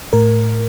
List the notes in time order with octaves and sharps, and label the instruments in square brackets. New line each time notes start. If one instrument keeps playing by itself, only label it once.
[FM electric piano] A2 A#4